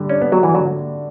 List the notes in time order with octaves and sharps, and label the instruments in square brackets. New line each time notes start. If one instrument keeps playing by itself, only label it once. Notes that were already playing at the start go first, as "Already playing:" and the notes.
Already playing: [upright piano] D3 G3
[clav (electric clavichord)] C#4 [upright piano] D4
[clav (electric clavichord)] B3
[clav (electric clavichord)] F#3 [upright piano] F#4
[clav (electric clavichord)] E3
[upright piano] D3 [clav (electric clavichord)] F#3